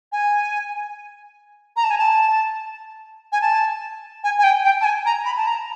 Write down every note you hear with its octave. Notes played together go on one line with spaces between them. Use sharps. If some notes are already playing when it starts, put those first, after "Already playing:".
G#5
A#5
A5
G#5
A5
G#5
A5
G#5
G#5
G5
G5
A5
G#5
A#5
B5
A5
A#5